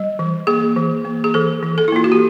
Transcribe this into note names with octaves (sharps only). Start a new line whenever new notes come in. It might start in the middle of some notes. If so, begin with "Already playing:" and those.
Already playing: G3
E3
A#3 G#4
E3
A#3
G#4
E3 A4
E3
A4
E4
A#3 F4
F#4
G4